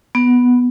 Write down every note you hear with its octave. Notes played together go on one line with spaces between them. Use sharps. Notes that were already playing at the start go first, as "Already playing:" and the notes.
B3